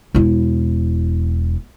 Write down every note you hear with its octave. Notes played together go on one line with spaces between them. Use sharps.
E1 E4